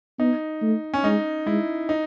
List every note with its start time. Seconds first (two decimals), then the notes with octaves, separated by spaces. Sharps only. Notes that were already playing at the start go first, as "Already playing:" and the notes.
0.19 B3 D#4
0.62 A3
0.94 C#4
1.04 G#3 D#4
1.46 G#3 E4
1.89 D#4